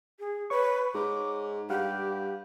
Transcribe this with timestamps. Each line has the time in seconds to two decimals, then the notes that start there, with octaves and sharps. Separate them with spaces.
0.19 G#4
0.50 B4 C#5 C#6
0.94 G#2 D6
1.70 G2 G4 F5 F#5